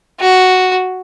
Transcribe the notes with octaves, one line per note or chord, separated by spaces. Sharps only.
F#4